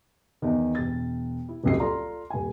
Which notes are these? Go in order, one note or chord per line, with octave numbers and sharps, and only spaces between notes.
E2 D#3
E1 A6
E4
D#1 G#1 C#2 F#3 C7
F4 A4 D5 A#5 C6
D#1 G#5